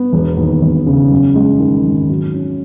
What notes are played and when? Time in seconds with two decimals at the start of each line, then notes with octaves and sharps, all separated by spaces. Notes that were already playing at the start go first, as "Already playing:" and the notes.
Already playing: B3
0.13 E1
0.37 D#2
0.62 E1
0.86 C#3
1.10 F#2
1.35 G#3
1.60 D#3
1.84 G#1
2.09 F#3
2.34 C#4